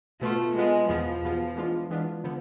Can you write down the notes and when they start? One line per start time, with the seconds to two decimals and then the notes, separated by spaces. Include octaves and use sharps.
0.21 B2 A3 B3 F4
0.55 B2 G#3 B3 F4
0.88 E2 B2 F3 B3 F4 G#4
1.22 E2 B2 B3 F4 G#4
1.56 E3 G#3 B3 D4 F4
1.90 E3 G#3 B3 D4 F4
2.24 D3 F3 B3